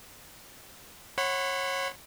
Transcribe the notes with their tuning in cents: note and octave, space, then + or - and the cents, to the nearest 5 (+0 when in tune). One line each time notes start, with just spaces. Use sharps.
C#5 -25 F#5 +0 B5 +30